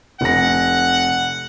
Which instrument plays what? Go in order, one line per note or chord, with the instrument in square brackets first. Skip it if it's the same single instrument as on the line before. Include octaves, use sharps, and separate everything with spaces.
[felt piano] F1 A#6 [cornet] F#5